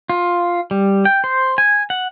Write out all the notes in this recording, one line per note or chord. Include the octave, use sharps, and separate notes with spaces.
F4
G3
G5
C5
G#5
F#5